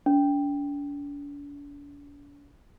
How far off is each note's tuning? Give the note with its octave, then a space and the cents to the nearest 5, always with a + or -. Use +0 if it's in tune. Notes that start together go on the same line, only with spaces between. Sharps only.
D4 -40